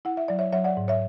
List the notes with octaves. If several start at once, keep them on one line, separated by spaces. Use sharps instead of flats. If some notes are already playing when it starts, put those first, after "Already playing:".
E4 F#5
E5
F#3 D5
C#5 E5
F#3 C#5 E5
D5 F#5
G#2
C#5 E5